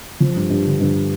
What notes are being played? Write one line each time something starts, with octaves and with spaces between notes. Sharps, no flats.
F3
G2
G2
D3
G2